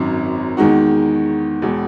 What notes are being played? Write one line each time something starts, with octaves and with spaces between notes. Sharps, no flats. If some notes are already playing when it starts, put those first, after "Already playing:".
Already playing: G#1 F#2 D#3
E2 D#3 G#3 D#4 F#4
E1 E2 B2 G#3